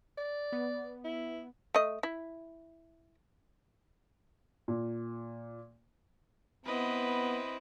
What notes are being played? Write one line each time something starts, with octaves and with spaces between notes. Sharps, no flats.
D5
B3
E4
A3 D#5
E4
A#2
B3 C4 E4 B4 D#5